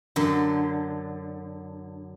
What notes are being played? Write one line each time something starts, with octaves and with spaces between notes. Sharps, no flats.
F#2 D3